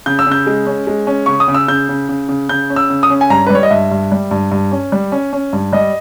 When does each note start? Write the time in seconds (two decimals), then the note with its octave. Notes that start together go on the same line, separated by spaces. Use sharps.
0.06 C#3 G6
0.19 E6
0.26 C#3
0.32 G6
0.47 G#3
0.66 C#4
0.87 G#3
1.07 C#4
1.26 C#3 C#6
1.40 D#6
1.48 C#3
1.54 E6
1.68 C#3 G6
1.89 C#3
2.09 C#3
2.29 C#3
2.49 C#3 G6
2.70 C#4
2.76 E6
2.90 C#3
3.03 D#6
3.10 C#4
3.21 G#5
3.30 G2 A#5
3.47 B4
3.50 G3 C#5
3.63 D#5
3.70 G2 E5
3.91 G2
4.12 G3
4.31 G2
4.52 G2
4.72 C#4
4.92 G3
5.12 C#4
5.33 C#4
5.53 G2
5.73 G3 D#5